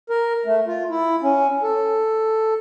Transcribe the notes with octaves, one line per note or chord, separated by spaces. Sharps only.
A#4
A3
F4
E4
C#4
A4